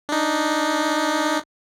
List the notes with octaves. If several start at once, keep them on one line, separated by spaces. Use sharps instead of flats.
D4 D#4